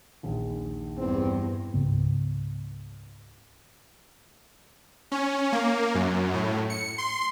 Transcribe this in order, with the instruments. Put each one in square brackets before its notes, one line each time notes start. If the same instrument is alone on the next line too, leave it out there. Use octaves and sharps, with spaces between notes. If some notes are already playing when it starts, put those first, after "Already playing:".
[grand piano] A#1 D#2
[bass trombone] E2 [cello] G2 [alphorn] C4
[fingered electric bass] C#2 G#2 C#3 B3
[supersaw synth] C#4
A#3
F#2
A2
C#7
C6